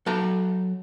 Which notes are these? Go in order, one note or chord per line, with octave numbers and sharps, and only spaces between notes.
F#3 A4 A#5